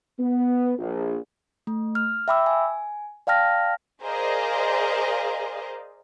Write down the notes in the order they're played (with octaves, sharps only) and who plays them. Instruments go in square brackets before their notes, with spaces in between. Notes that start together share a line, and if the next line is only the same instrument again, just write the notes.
[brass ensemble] B3
A#1
[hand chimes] A3
F6
E5 G5 B5 D6 E6
G#5
D5 F5 G5 A5 F6 A#6
[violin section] G#4 A#4 C5 D5 D#5 F5